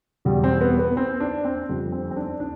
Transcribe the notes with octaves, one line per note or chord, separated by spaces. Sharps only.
E2 B2 G3
C4
B3
B3
C4
D4
C4
F2 D3 G3
C4
C4
D4
D4